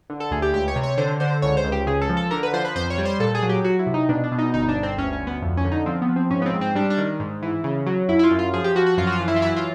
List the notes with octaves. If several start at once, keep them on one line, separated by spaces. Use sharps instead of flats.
D3
A4
D2 G#4
G4
C#2 G4
C#5
C3
C#5
D3 C5
D3 C5
C#2 C#5
C5
C#2
G4
C#3 G#4
A4
F3
A4
D3 A#4
B4
F3 C5
B4
F2 C5
C#5
G3
C5
A#2 A4
G#4
F#3
G4
F#3 F#4
E4
C3
D#4
B2 D4
D4
B2
D#4
G1 D#4
D4
G1
C4
D2 C#4
C#4
D2
B3
F2
C#4
D3
D#4
F3 C4
B3
F3
C4
G#2 C#4
B3
C4
G#2
C4
G3 D4
D4
D#3
G#2
E3
C#3
F#3
F#2 E4
E4
F4
F#2
F4
F3 G#4
G4
F3 F#4
F#4
F#2 F4
F#4
F4
E3
E4
F4
F#3 E4
F4